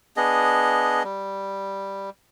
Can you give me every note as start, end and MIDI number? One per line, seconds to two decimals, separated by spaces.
0.17 1.03 59
0.17 1.03 62
0.17 1.03 68
0.17 1.03 75
1.04 2.10 55